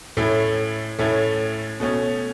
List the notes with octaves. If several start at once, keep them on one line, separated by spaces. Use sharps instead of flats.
A2 A3 C#4 E4
A2 A3 C#4 E4
B2 A3 C#4